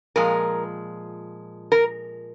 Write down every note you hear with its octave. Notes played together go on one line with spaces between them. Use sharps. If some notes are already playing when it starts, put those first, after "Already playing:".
A#2 F3 G#3 A#4
A#4